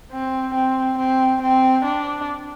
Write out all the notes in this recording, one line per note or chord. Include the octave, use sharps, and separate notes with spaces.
C4
C4
C4
C4
D4